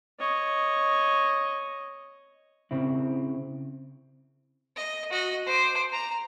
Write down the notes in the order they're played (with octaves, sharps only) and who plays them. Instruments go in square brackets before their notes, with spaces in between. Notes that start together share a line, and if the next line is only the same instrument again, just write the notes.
[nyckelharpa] C#5 D#5
[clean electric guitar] C#3 C4 E4
[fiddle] D#5
F#4 D#5
C5 D6
A#5